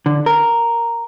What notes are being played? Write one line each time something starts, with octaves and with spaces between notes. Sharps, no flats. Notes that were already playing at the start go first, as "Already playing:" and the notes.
D3
A#4